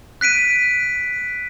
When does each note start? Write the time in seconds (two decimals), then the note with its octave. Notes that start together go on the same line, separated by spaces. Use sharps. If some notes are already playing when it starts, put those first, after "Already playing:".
0.21 F#6 B6 D7 D#7